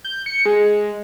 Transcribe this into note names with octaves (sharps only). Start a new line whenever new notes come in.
G6
C#7
G#3